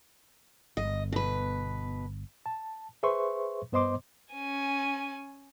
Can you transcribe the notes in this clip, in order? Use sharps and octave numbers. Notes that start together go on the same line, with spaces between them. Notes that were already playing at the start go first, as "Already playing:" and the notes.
G1 D#5
B2 B4
A5
G#4 B4 C5 E5 C6 C#6
G2 B3 C5 D#5 C6 D6
C#4 G#5